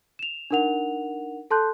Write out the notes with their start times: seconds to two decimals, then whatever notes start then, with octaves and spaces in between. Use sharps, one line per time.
0.19 E7 F7
0.51 D4 D#4 A#4 F#5 F7
1.51 A4 A5 C6 F#6 G6